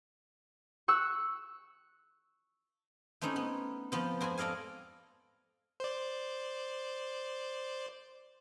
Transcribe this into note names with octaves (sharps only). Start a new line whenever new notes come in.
C#6 E6 F#6
A3 C4 C#4 D#4 E4
B3
F3 B3 C4
F2 C4 B4 G#5
A4 D5 D#5 F5 G#5
C5 D5